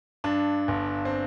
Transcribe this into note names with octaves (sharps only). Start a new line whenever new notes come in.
G2 D4
G1
C4